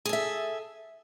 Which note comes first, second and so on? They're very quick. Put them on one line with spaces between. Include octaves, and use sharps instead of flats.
G#4 A4 E5